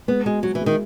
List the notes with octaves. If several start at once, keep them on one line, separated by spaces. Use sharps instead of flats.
G#3 B3
G#3 F#4
F#3 F#4
E3
G#3
D#3